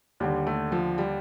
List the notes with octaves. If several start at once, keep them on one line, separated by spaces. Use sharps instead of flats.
D#2 D3 G3
A3
F3
G3